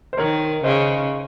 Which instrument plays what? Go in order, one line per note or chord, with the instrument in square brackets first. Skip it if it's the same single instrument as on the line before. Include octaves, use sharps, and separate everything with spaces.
[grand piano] C5
[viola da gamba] D#3 [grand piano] A#4 C#5
[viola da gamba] C#3 [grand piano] C5 D#5